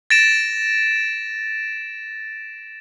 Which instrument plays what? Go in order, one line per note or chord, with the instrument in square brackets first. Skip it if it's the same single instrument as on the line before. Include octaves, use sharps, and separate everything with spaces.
[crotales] A6 A#6 D7 E7